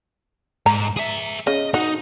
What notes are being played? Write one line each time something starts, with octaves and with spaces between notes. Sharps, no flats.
G#2 A#5
G#4 E5
C#3 D#5
D#4 F#4